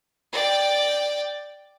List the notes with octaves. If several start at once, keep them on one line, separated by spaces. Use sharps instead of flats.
D5 G5